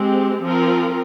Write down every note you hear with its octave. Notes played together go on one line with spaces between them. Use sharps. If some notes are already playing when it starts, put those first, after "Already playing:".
Already playing: G#3 C4 G4
F3 C4 F4 A#4